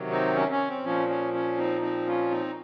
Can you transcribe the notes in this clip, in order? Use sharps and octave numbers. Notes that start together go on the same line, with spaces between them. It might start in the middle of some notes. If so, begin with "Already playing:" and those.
Already playing: C3 D#3 F#3
C4 D#4
C#4
C#4
C4
A#2 F3 C#4
C#4
C#4
C4 D#4
C4 D#4
C#4 F4
C4 D#4